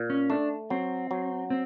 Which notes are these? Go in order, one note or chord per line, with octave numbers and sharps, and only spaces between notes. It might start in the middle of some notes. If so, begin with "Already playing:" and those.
Already playing: A#2
C#4
A3 D4
F#3 C4
F#3
C4